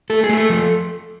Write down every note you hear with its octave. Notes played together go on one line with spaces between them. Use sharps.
A3 A4
G#4
A3
A4
F3